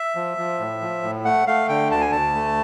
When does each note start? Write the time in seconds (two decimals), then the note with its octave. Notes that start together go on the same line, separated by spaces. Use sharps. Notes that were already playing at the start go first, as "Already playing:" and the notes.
Already playing: E5
0.15 F3
0.38 F3
0.59 A2
0.81 F3
1.03 A2
1.25 A3 F#5
1.47 A3 F5
1.69 D3 G5
1.91 D2 A5
2.01 G#5
2.12 D2 A5
2.35 A3